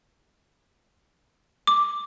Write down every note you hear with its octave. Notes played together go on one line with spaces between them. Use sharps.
D6